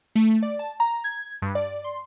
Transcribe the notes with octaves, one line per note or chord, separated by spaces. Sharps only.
A3
D5
A5
A#5
G#6
G2
D5
C6